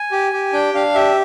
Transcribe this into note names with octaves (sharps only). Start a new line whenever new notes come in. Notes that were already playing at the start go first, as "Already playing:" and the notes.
Already playing: G#5
G4
G4
D4 G5
D4 F5
G4 E5